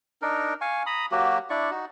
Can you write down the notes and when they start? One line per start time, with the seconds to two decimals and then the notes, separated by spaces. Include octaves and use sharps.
0.22 D4 D#4 A#4
0.61 F5 G#5 C#6
0.86 A#5 B5 D#6
1.12 F#3 A#3 F#4 G4
1.50 D4 E4 D5 C#6
1.71 D#4 F#4